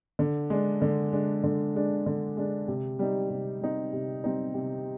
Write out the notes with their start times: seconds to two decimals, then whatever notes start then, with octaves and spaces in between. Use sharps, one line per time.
0.19 D3
0.50 G#3 D4
0.82 D3
1.13 G#3 D4
1.44 D3
1.75 G#3 D4
2.06 D3
2.37 G#3 D4
2.68 C3
2.99 G3 C4 D#4
3.30 C3
3.61 G3 C4 D#4
3.93 C3
4.24 G3 C4 D#4
4.54 C3